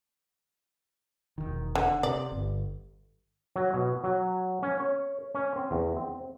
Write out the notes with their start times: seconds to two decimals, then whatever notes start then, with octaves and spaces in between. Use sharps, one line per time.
1.38 E1 A#1 D#3
1.75 D3
2.03 C3 D5
2.32 G1
3.56 F#3
3.74 B2
4.04 F#3
4.63 C#4
4.80 C#5
5.35 C#4
5.56 C4
5.71 E2
5.97 C4